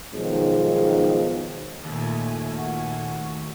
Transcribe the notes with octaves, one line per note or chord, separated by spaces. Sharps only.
B1 B2 D#3 F3 G#3
D#2 A#2 A3 G#5
F#4